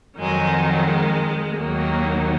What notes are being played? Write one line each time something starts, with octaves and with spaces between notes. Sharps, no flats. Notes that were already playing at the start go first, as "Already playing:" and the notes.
F2 D#3 F#3 G#3
F#3
G#3
D#2 D#3 F#3 A#3